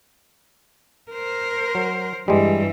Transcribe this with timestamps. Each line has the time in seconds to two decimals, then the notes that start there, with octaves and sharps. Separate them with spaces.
1.12 A#4 C5
1.75 F#3
2.28 G2 E3 G3 G#3